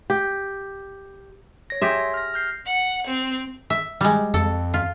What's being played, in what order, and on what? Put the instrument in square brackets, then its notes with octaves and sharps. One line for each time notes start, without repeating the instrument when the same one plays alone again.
[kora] G4
[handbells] C#5 A#6
[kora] G4 G#4 E5 [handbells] C6
[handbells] F6 A#6
F6 G6 C7
[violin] F#5
C4
[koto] E5
G3 G#3
[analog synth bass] F2 [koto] A4
[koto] F4